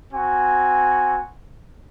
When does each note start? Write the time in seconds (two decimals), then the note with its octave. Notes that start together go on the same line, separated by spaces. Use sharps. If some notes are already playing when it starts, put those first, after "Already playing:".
0.12 C4 F#4 G#5